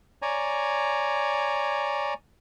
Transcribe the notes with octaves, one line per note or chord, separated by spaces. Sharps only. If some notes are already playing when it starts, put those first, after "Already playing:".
C#5 D5 G#5 A#5